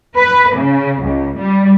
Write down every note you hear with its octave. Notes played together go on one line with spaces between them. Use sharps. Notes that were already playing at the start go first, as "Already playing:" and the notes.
B4
C#3
C#2
G3